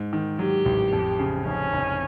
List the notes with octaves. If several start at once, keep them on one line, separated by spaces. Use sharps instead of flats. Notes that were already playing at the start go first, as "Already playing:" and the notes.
Already playing: G#2
D#3
F#3 G4
A1
F2
C#3
F1 C#4
F1